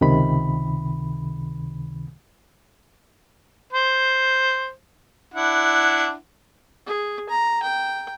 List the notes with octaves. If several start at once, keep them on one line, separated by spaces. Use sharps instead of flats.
C#2 C3 D#3 B5
C5
D4 E4 F#5
G#4
A#5
G5